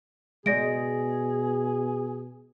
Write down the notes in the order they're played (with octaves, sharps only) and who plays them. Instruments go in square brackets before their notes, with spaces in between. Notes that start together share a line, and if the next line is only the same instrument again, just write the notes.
[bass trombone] B2 [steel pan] G#3 [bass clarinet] G#4 [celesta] D5 A#6 D7